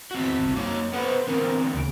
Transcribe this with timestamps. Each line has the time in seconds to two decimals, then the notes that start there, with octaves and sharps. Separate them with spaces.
0.11 E2 C4 F#4 B6
0.38 G1 C2
0.56 F#2 A#3 D#4 C#5
0.92 B3 A4 B4 C5 F#5
1.27 D3 E3 B3 C4 A#4
1.74 D2 C#3 D7